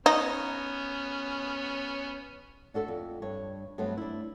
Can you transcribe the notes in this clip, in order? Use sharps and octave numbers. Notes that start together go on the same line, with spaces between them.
B3 C#4 D#4
D4 F#4 A4 C#5 E5
F2
G2 C#5
G2 F#3 A3 B3 C4
D4 E4